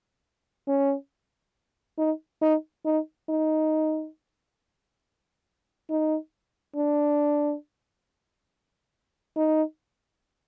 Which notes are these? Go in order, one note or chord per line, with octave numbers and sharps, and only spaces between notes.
C#4
D#4
D#4
D#4
D#4
D#4
D4
D#4